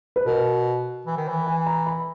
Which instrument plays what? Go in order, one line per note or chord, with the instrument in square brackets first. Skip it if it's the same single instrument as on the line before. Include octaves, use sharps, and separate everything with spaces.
[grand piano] B4
[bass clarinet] B2 [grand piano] A#4
[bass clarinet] E3
D#3
E3
[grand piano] G#5
A#5
B5